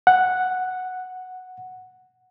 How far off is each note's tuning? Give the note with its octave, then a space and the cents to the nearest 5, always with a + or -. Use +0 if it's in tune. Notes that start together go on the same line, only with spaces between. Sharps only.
F#5 +0